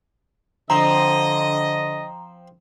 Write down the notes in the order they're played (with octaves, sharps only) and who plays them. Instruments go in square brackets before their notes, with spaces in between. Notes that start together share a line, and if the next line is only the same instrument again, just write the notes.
[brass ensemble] D3 D#5 [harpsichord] F3 C4 [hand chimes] A#5